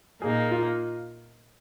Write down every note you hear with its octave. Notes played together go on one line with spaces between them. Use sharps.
A#2 A#3 D#4 G#4
F4